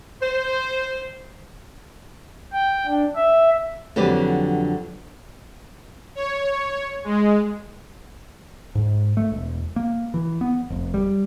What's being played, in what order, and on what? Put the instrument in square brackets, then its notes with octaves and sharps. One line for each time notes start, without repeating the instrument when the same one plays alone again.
[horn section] C5
[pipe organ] G5
D4
E5
[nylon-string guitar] F2 D3 F#3 G4 B4 D5
[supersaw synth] C#5
G#3
[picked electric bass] G#2
A3
E1
A#3
E3
B3
F1
G3